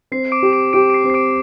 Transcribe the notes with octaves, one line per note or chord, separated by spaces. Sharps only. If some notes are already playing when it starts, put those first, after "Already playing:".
C4 C7
D6 D7
G4
D6 D7
G4 D6 D7
D7
C7
C4
C7
D6 D7